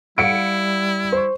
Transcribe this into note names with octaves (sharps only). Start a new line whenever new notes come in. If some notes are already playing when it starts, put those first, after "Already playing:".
G3 E4 F5 F#5 C#7 D7
C5 C#6